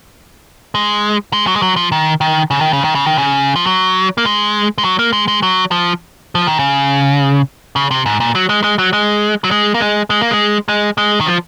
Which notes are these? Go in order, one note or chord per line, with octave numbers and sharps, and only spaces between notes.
G#3
G#3
F#3
G#3
F#3
F3
D#3
D#3
C#3
D#3
C#3
D#3
C#3
D#3
C#3
F3
F#3
A#3
G#3
G#3
F#3
A#3
G#3
G#3
F#3
F3
F3
D#3
C#3
C#3
C3
G#2
A#2
F#3
G#3
G#3
F#3
G#3
F#3
G#3
A#3
G#3
G#3
A#3
G#3
G#3
G#3
D#3
F3